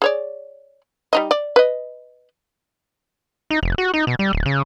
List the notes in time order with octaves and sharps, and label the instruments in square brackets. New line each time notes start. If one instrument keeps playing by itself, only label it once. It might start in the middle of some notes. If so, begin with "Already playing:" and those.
[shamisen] G#4 C#5 D5
G3 D#4 D#5
D5
B4 D#5
[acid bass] D#4
F1
F#4
D#4
B2
G3
D1
C#3